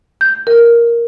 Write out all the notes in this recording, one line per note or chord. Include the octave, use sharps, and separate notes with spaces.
G6
A#4